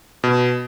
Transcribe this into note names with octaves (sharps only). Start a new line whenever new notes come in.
B2